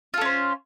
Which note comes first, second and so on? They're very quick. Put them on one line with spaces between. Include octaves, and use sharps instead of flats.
F4 A4 C#4 C5